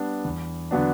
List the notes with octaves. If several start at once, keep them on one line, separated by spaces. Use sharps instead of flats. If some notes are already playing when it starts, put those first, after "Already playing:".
Already playing: G3 B3 D4
E2
D3 F#3 B3 D4